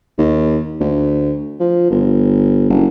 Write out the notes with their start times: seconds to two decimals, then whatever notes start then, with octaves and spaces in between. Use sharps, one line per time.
0.18 D#2
0.80 D2
1.60 F3
1.91 G1
2.70 F#1